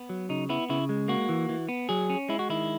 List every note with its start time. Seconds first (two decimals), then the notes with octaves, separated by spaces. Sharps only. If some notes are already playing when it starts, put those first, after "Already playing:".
Already playing: B3
0.09 F#3
0.29 C#3 D#4
0.49 B3 E4
0.69 C#3 E4
0.89 G#3
1.08 A#3 F#4
1.29 E3
1.49 E3
1.69 B3
1.89 F#3 G#4
2.10 C#4
2.29 G#3 E4
2.39 F#4
2.49 D#3 E4